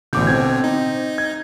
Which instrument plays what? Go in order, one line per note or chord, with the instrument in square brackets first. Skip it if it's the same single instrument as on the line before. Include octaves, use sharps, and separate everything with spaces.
[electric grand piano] A1 D6 G6 [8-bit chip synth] B2 D3
[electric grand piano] C4 G#6
[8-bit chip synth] D#4
[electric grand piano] G#6